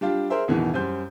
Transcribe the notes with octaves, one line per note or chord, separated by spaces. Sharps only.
G3 D4 F4 G4
G#4 A#4 C5 E5
A1 E2 B2 D#3 E3
F#2 G3 C5 G6